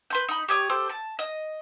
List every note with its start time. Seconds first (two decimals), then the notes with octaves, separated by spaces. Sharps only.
0.10 B4 C6 G6
0.29 D#4 B5
0.48 G4 C#5 D#6
0.70 G4 A4 C5
0.90 A5
1.19 D#5